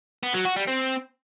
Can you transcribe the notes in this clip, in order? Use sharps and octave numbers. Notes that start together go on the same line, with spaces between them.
B3
F#3
F#4
G3
C4